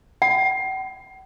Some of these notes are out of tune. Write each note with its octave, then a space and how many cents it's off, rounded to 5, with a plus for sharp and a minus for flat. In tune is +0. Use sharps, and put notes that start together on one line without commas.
F#5 +45